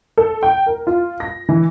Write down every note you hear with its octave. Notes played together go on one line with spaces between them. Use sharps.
A4
G5
A#4
F4
A#6
E3